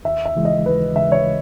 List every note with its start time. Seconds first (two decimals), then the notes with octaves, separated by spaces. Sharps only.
0.05 D#2 E5
0.25 E5
0.35 C#3 E3 G#3
0.45 D#5
0.66 D#2 B4
0.96 C#3 E3 G#3 E5
1.12 C#5